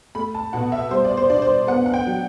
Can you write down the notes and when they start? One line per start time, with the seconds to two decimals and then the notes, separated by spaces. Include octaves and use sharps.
0.15 A3 B5
0.35 A5
0.53 B2 F#5
0.72 E5
0.91 G3 C5
1.05 D5
1.17 C5
1.30 D4 D5
1.42 C5
1.67 B3 F#5
1.86 F#5
1.94 G5
2.07 F#3